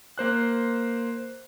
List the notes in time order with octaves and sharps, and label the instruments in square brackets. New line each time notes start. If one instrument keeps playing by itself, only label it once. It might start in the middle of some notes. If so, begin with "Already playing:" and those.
[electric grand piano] A#3 C5 F#6